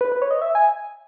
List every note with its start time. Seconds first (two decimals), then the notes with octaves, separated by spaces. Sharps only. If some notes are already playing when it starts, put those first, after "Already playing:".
0.01 B4
0.12 B4
0.22 C#5
0.31 D#5
0.42 E5
0.55 G#5